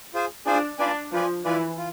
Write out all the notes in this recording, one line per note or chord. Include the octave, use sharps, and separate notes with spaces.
F4 G#4 C5 G#5
D4 F4 G#4 C5 G#5
D4 F4 B4 D5 G#5
F3 F4 B4 D5 G#5
E3 F4 B4 D5 G#5
F4